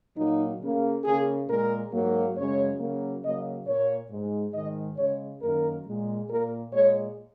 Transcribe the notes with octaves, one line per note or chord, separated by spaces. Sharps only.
A#2 F#3 A#3 D#4
C#3 A#3
C#3 A#3 G#4
A#2 G#3 A#4
G#2 F#3 A#3
F#2 C#3 G#3 C#5
C#3 F#3 A#3
C#3 F#3 A#3 D#5
A#2 A#3 C#5
G#2 G#3
G#2 D#3 G#3 D#5
C#3 G#3 C#5
F#2 D#3 A#3 A#4
A#2 G#3
A#2 A#3 A#4
A#2 G#3 C#5